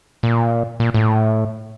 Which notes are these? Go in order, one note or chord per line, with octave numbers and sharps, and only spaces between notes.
A#2
A#2
A2